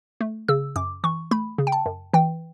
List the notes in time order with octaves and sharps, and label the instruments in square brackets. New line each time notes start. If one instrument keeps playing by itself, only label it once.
[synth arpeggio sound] A3
C#3 E6
F#2 D6
E3 C#6
A3 B5
C#3
G5
A5
F#2
E3 G5